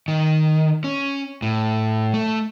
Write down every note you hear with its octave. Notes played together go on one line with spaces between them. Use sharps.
D#3
C#4
A2
A3